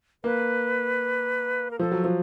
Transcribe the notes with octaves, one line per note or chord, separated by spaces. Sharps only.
A#3 B4
A#4
F3 A4
F#3
F3